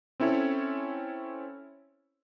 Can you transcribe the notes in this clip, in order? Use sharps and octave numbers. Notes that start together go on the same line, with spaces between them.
C4 C#4 E4 A4 C#5